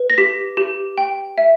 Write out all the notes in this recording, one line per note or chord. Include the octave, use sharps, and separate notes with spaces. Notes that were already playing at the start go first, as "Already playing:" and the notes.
Already playing: B4
A#6
G4 B6
G4
G5
E5